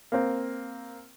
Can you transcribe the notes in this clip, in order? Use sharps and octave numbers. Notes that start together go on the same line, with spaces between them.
A#3 C4